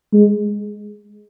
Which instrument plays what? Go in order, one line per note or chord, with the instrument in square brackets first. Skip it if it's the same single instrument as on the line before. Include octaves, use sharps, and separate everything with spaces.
[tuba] G#3